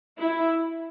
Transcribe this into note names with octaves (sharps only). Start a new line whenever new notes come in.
E4